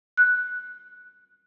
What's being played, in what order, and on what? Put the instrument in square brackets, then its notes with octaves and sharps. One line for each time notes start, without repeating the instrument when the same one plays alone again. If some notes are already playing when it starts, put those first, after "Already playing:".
[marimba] F#6